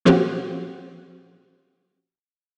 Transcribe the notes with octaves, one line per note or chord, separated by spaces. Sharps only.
A#2 F3 C4 C#4 F#4 G4